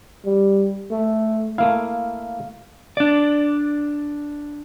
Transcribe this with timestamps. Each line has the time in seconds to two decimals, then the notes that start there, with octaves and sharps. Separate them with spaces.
0.25 G3
0.91 A3
1.58 A3 A#3 E4 F5
2.97 D4 D5